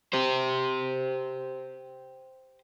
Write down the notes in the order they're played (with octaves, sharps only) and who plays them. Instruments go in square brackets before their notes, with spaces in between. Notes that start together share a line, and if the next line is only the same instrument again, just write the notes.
[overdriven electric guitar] G4 C5